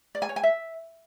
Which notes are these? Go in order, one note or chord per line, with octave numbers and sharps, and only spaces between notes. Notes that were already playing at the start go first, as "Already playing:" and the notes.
D5
G#5
C#5
G#5
E5